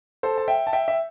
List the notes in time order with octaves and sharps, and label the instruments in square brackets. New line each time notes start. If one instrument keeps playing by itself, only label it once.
[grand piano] A4 C5
A5
E5 G5
A5
E5 G5
E5